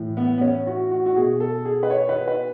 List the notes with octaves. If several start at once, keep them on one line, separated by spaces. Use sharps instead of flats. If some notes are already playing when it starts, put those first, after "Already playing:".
Already playing: A2 E3
B3
B3
C#4
F#4
F#4
F#4
B2 G#4
A4
G#4
B4
C#5
B4
B4